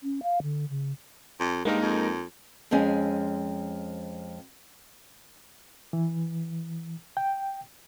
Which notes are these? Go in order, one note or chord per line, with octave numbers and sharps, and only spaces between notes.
C#4
F5
D3
C#3
F2
G2 G#3 A#3 D#4 A#4
F2
F2 G#3 C4 C#4 G#5
E3
G5